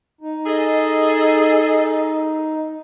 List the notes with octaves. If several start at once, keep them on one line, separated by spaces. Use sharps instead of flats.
D#4
G#4 A4 D#5